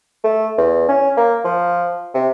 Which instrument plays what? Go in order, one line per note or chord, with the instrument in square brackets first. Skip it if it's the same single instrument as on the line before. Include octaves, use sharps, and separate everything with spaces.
[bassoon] A3
E2
C#4
A#3
F3
C3